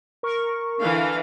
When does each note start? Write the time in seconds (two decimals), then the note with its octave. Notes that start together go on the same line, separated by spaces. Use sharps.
0.23 A#4 C#6
0.79 D3 E3 F5